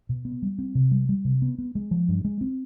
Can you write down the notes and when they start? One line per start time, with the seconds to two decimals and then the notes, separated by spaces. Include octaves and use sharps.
0.09 B2
0.25 B3
0.42 G3
0.59 C4
0.75 C3
0.91 G3
1.09 G3
1.25 C3
1.42 B3
1.58 B3
1.75 G#3
1.91 F3
2.08 G2
2.25 G#3
2.41 C4